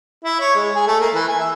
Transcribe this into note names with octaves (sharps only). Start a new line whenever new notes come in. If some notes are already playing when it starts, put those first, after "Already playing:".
E4
C#5
G#3
G#4
A3
A#3
E3
G#5
E5